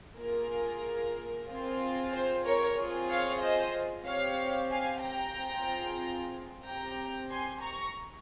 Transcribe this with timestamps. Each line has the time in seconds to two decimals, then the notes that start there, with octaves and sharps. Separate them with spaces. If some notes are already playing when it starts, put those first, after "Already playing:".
0.18 A#3 F4 G#4 A#4
1.48 C4 F4 G#4
2.13 C5
2.45 A#4 C#5
2.78 C4 F4 G#4
3.09 C#5 F5
3.41 C5 D#5
4.06 C4 G4 C#5 F5
4.71 F5 G#5
5.03 G5 A#5
5.36 C4 F4 G#4
6.65 C4 G4 G5 A#5
7.30 G#5 C6
7.62 A#5 C#6